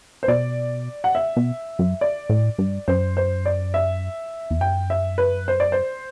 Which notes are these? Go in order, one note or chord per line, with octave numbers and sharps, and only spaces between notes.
C5
B2 D5
F#5
E5
B2
F#2
D5
A2
G2
F#2 C5
C5
D5
E5
E2
F#2 G5
E5
B4
C5
D5
C5